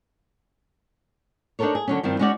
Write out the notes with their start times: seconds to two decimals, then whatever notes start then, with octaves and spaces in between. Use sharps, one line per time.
1.59 D4 D#4 F#4 A4 A#4 C#5
1.75 G#4
1.88 D3 F#3 C#4
2.03 G2 D#3 F3 C4
2.19 G#3 C#4 D#4 F#4 D5